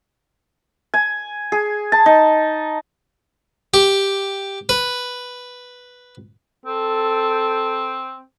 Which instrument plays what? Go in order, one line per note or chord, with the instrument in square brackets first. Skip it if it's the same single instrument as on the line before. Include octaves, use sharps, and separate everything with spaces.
[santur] G#5
G#4
A5
D#4
[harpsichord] G4
B4
[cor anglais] C4 [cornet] A4